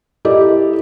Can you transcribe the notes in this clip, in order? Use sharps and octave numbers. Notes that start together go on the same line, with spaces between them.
E4 G4 A4 A#4 D5 D#5